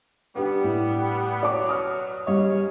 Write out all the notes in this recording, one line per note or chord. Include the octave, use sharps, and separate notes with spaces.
G3 B3 D4 G4 B4
A2
B2 F#3 D5 D6
D#6 F6
G#2 C#3 G3 C#5 D#5